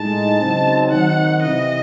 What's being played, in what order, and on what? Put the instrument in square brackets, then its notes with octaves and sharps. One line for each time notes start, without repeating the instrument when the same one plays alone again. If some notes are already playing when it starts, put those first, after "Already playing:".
Already playing: [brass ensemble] A2 G#3 D#4 [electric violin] A5
[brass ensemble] C#3 F#3 C4 D#4
[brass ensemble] D#3 F#3 C4 D#4 [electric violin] F#5
[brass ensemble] C3 E3 C4 E4 [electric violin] D#5